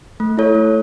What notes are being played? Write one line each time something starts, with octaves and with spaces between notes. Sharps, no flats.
A3
E4 A4 C#5
A3